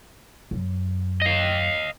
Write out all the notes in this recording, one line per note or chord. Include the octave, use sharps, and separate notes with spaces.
F#2
D#5 F5